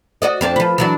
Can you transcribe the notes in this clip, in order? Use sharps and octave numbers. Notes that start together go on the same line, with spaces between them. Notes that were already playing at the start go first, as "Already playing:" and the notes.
F#4 D5 D#5
F2 C4 D4
F3 B4
E3 F#3 D4